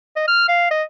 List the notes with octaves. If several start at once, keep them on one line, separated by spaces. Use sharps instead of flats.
D#5
F6
F5
D#5